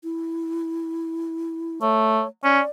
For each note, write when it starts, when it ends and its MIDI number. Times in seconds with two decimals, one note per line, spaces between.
0.04 1.79 64
1.82 2.23 57
1.82 2.28 73
2.44 2.60 61
2.44 2.70 74